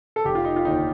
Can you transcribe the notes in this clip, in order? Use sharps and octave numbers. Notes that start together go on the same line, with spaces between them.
A4
F1 G4
F4
D#4
F4
D#2 D3 D#4